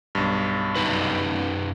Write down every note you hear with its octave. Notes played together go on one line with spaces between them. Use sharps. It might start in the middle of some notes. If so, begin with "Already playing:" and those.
B1 G2
F#2 D#4 B4